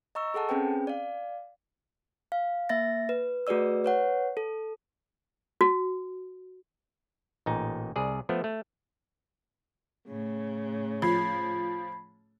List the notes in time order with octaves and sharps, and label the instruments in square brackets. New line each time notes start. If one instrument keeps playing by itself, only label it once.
[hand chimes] D#5 A#5 C#6 E6
G#4 A4 F#5 A5
C4 C#4 G#4 B4 G5
D5 F5
F5
A#3 E5 A6 A#6
B4
A3 F#4 G#4 B4 D5 E6
B4 C#5 F#5
A4
[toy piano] F#4
[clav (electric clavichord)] A1 A#2 D#4
C2 G#4 D5
F3 A3 B3
A3
[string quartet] A2 C#3
[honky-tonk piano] F3 [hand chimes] B5 G#6 C7